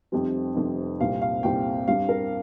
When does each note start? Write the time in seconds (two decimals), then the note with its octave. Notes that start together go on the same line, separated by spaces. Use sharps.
0.12 F1 F2 C3 G3 C4
0.56 F1 F2 C3 G3 C4
1.00 C2 A#2 G3 C4 F5
1.22 F5
1.43 C2 A#2 G3 C4 G5
1.88 G2 G3 C4 F5
2.09 A#4